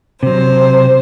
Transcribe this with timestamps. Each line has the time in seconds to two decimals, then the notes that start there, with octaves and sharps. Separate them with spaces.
0.23 C3 F#3 C5